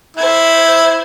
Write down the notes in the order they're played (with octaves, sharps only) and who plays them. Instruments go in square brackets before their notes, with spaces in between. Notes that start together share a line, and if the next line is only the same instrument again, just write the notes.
[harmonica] E4 [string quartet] C5 G#6